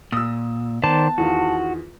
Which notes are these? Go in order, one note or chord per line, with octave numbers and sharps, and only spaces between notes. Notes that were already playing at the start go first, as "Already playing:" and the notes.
A#2 D#6 E6
D#3 B3 C5 D5 A5
E2 D#3 F4 F#4